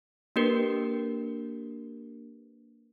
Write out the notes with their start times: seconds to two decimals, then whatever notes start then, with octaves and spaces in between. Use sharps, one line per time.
0.36 A#3 D4 G4 A#4 B4